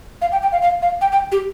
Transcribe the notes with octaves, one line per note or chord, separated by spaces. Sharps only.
F5
G5
G5
F5
F5
F5
G5
G5
G4